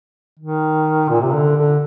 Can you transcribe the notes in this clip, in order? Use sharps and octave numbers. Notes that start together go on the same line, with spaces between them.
D#3
A#2
C3
D3
D3